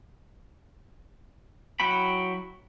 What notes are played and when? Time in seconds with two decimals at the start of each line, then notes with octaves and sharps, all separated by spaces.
1.80 F#3 E4 F#4 G5 B5